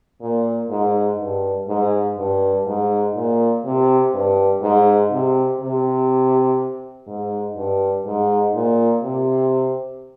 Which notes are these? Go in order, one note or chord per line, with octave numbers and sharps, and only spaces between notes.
A#2
G#2
G2
G#2
G2
G#2
A#2
C3
G2
G#2
C3
C3
G#2
G2
G#2
A#2
C3